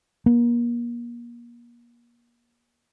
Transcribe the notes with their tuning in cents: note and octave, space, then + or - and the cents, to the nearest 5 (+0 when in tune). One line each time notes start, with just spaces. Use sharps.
A#3 +35